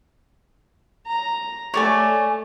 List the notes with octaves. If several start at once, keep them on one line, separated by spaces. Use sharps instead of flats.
A#5
A3 C#5 D5 G#5